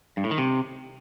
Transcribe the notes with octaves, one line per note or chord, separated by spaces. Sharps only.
G2
A2
D#3
C3